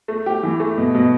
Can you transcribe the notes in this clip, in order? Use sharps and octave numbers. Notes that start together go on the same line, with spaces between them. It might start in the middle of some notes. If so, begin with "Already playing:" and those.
A3
G4
E3
A3
B2
B2